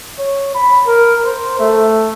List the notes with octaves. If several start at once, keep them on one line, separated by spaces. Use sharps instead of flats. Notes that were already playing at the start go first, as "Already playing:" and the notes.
C#5
B5
A#4
C5
A3